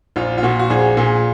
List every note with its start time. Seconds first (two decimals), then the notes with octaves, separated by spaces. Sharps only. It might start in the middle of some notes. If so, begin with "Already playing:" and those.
0.16 A#1 F4
0.38 F4
0.43 A#2 F#4
0.59 F#4
0.70 A#1 G#4
0.97 A#2 G#4